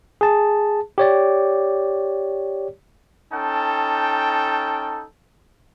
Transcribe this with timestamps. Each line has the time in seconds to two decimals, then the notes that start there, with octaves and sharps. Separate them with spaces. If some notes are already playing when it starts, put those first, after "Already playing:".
0.21 G#4 A5
0.98 G4 C#5 D5
3.33 C#4 D#4 A4 G5 A5